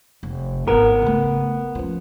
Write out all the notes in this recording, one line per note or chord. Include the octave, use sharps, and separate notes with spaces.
F1
G#1 B3 A#4
C#3 A3
F3 C#4